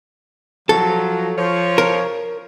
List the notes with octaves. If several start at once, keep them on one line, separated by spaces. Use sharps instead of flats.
F3 F#3 A4
F3 C#5
A#4